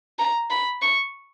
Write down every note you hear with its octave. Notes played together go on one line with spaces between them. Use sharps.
A#5
B5
C#6